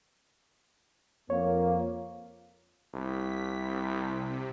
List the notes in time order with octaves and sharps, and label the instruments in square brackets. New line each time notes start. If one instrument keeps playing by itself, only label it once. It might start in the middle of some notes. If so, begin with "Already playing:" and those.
[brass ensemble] F2 A#3 [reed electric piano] C#5
[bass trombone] C2 [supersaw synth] B6
[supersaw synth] C4
C3